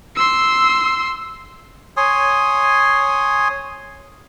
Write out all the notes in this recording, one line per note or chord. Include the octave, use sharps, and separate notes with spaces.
C6 E6
C#5 G#5 C6 D#6